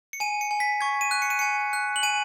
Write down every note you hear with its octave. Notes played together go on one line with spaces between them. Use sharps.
C#7
G#5 D#7
C#7
G#5
B6
C#6 G#6
D#7
F#6
C#7
D#7
G#5 C#7
F#6
F#7
G#5 D#7